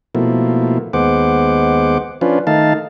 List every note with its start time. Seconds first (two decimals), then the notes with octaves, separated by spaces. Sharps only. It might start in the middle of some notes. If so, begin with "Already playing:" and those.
0.15 B2 F3 A3 A#3 E4
0.93 D#2 G#3 B3 C5 F#5 D6
2.21 F3 C#4 D4 F4 B4
2.47 D#3 A3 D#4 F5 A5